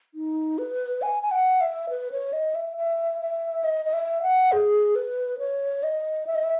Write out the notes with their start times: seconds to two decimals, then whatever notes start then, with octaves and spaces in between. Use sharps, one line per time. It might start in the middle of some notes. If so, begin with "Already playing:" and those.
0.14 D#4
0.58 B4
1.02 G#5
1.23 G#5
1.31 F#5
1.61 E5
1.90 B4
2.12 C#5
2.33 D#5
2.55 E5
2.77 E5
3.21 E5
3.64 D#5
3.85 D#5
3.93 E5
4.23 F#5
4.52 G#4
4.95 B4
5.39 C#5
5.83 D#5
6.27 E5
6.35 D#5
6.43 E5